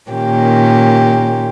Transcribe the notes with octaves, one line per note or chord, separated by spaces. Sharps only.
A#2 D#3 A#3 C#4 G4